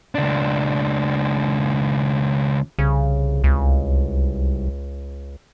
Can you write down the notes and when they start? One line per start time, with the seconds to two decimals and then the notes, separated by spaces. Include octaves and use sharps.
0.15 C#2 D4
2.79 C2 C#3
3.44 C#2